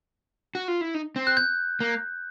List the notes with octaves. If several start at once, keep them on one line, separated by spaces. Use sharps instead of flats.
F#4
F4
E4
D#4
C4
F#6
G6
A#3